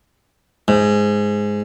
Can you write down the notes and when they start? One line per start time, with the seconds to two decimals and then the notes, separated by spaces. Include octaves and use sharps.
0.68 G#2